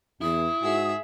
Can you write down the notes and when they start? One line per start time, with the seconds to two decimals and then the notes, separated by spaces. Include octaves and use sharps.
0.21 E2 E4 D#6
0.63 G#2 F#4 G#4 E5